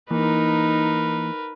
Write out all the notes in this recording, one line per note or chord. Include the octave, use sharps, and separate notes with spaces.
E3 A#3 D#4 A#4 B4